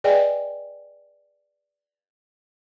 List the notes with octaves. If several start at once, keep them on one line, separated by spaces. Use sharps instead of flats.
G#4 B4 D5 D#5 G5 G#5